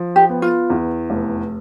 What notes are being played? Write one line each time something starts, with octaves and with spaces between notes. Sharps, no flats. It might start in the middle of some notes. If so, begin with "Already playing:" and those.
Already playing: F3
G4
B3
F4
E2
F1